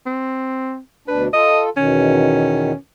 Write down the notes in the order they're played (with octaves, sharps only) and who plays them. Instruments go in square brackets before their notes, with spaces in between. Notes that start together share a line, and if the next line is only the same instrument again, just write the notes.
[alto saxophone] C4
[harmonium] D2 B2 D4 [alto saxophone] B4
[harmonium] F4 A4 [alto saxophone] D#5
[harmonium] E2 B2 D#3 [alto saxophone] C#4